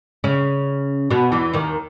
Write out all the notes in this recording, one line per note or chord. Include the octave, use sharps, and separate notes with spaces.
C#3 C#4
B2 B3
E2 E3
D#2 D#3